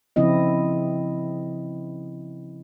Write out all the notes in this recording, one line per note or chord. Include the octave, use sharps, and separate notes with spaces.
C#3 F3 C4 E4 D#5